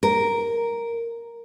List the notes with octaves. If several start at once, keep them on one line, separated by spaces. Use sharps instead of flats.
A#4